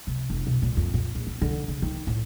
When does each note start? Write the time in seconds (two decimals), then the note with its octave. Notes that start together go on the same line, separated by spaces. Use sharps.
0.07 C3
0.30 F1
0.47 B2
0.62 A#2
0.77 F2
0.94 A#2
1.15 A#1
1.27 B3
1.42 D3
1.68 C#3
1.82 D#3
2.07 A2